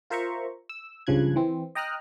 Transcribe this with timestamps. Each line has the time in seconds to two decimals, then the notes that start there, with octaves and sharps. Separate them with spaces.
0.10 F4 A#4 C5 E5 A#5 C#6
0.69 E6
1.07 C#2 G2 C#3 F3 F#6 G#6
1.36 E3 C4
1.75 D#5 G5 A#5 D#6 F6 F#6